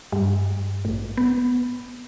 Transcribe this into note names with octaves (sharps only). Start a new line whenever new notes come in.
G2
A1
B3